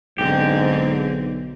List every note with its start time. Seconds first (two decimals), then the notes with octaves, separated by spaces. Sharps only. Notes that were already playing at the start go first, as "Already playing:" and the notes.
0.18 B1 G#2 D3 C4 G4